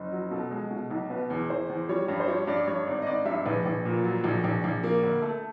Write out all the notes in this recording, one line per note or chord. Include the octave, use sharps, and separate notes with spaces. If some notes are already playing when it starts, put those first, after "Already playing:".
Already playing: F#1
F#3
B2 A4
G#3
B2
B1
B2 B4
E2
E2 C5
E2
G3 C#5
G2
C5
G3 C#5
G2 D5
G2 C#5
G#1 D5
D#5
G#1 D5
G2 E5
A#1 B4
A#1
A#2
F#3
A#1
A#1
A#1
A#3
D2
A3 A4